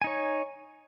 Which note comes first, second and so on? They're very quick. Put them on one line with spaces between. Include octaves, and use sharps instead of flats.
G#5 D#4 C#5